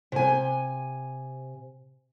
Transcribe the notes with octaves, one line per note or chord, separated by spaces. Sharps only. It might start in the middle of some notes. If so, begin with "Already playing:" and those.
C3 G#5